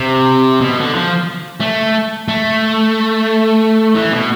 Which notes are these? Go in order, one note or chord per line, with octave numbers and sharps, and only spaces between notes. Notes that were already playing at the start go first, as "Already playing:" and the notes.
Already playing: C3
B2
D3
F3
A3
A3
E3
B2